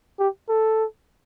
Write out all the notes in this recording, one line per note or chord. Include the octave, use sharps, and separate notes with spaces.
G4
A4